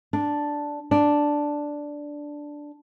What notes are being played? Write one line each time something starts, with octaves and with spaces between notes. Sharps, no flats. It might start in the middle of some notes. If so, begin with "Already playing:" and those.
D4
D4